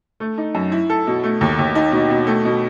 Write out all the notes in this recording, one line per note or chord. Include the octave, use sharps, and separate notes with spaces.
A3
D#4
F#2
E4
A4
B2
A3
D#2
D#2
D#4
B2
B2
A3
B2